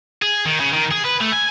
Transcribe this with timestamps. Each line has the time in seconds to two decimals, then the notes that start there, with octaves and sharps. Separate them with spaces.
0.22 G#4
0.46 D#3
0.60 C#3
0.73 D#3
0.91 G#4
1.05 B4
1.20 A3
1.32 G#5